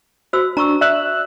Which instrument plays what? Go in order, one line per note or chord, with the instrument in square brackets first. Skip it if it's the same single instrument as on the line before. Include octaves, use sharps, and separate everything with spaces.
[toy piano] F#4 C5 E6
[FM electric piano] D4 [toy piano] A#5 C#6 E6
[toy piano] D5 [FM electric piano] E5 E6 F#6